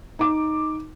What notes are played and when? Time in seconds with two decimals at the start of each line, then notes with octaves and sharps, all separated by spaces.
0.19 D#4 D6